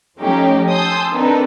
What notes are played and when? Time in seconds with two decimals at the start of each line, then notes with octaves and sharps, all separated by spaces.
0.20 F3 A3 C#4 D#4 G4
0.69 G#5 A5 C6 D#6 E6 G6
1.13 D#3 C4 D4 D#4 A4 B4